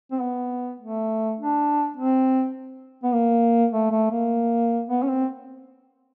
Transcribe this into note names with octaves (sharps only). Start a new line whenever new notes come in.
C4
B3
A3
D4
C4
B3
A#3
A3
A3
A#3
B3
C#4
C4